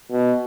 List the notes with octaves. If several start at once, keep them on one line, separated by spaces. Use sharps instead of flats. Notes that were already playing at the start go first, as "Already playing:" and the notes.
B2